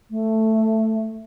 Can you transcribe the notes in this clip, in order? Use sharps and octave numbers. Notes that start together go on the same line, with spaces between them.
A3